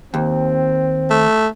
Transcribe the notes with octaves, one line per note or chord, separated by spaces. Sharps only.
D#2 C4
A3